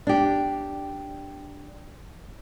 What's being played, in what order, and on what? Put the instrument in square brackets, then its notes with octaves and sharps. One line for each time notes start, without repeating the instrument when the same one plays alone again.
[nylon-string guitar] D4 G4